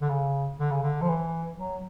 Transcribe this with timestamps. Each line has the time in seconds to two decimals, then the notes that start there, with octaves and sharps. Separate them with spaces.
0.01 D3
0.09 C#3
0.59 D3
0.71 C#3
0.82 D3
1.02 F3
1.08 E3
1.58 F#3